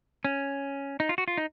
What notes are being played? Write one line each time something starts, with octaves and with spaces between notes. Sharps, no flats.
C#4
D#4
F4
F#4
F4
D#4